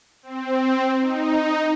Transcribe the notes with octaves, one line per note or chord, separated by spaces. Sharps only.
C4
D#4